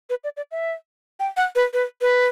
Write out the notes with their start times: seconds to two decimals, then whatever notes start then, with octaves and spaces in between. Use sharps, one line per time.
0.10 B4
0.24 D5
0.37 D5
0.51 E5
1.20 G5
1.37 F#5
1.56 B4
1.73 B4
2.01 B4